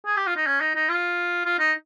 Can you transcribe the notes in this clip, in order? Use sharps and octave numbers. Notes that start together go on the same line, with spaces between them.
G#4
G4
F4
D#4
C#4
D#4
D#4
F4
F4
D#4